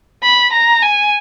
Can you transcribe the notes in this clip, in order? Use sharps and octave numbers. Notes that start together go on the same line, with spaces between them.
B5
A#5
G#5